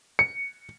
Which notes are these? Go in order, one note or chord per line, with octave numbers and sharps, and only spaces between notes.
C#7